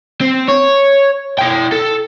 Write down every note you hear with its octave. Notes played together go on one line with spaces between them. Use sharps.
C4
C#5
E4 G5
A4